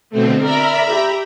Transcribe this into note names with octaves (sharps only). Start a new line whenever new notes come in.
B2 D3 A3 C4
A#4 D5 E5 A#5 B5
G4